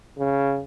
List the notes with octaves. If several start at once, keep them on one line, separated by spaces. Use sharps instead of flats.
C#3